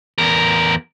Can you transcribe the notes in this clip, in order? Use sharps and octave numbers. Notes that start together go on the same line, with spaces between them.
E2 A#4